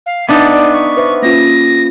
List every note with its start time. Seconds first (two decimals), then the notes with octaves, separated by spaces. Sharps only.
0.06 F5
0.29 B3 D4 D#4 E5 A5 A6
0.53 D5
0.73 C#6
0.97 B4 C5 E5
1.22 A#3 C#4 F4 A#6